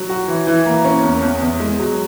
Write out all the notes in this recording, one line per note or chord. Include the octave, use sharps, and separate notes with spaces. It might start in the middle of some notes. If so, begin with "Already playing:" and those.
Already playing: F#3
F#4
E3
E3
A#3
C#4
E2
E2
E2
G#3
F#3